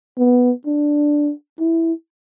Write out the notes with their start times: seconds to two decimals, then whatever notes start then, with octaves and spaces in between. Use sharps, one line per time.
0.19 B3
0.66 D4
1.60 E4